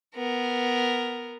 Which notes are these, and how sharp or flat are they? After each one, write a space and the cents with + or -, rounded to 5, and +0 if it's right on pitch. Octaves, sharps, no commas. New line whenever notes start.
B3 +0 A#4 +0